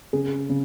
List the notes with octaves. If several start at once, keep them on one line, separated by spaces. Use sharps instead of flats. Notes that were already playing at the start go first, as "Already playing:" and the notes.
C#3 G#4
C#3